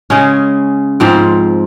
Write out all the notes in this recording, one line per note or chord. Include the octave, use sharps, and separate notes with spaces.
C#3 G#3 C#4
G#2 F3 C4